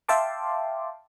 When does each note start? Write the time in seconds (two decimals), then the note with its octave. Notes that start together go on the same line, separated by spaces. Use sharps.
0.09 E5 F5 G5 A5 C6 D6